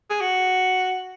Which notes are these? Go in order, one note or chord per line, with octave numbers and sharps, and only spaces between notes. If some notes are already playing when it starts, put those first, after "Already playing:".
G#4
F#4